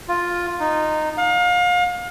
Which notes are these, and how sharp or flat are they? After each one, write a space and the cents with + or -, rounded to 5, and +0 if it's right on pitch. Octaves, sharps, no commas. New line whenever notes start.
F4 +5
D#4 -15
F5 +35